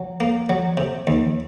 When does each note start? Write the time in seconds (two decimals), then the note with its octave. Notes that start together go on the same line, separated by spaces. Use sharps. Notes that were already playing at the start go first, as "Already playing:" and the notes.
Already playing: F#3
0.20 A#3
0.49 F#3
0.77 C3
1.07 D#2